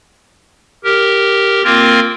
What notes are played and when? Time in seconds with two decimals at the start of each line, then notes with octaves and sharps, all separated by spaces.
0.84 G4 A#4
1.64 A#3 C4 F4 A#4